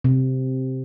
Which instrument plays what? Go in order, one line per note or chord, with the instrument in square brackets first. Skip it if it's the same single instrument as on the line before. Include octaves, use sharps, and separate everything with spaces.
[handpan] C3